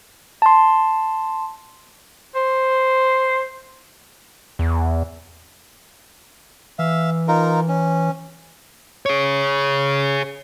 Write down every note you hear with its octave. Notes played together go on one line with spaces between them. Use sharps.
A5 C6
C5
E2
E3 E5 F5
D#4 F4 A#4
C#4
G#4 C#5